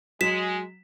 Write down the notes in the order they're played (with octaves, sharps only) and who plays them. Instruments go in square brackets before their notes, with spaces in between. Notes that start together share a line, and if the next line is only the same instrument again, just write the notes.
[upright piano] F#3 [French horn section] G#3 [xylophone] B6 E7